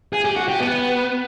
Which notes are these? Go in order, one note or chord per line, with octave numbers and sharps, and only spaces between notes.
G#4
G4
F#4
G4
B3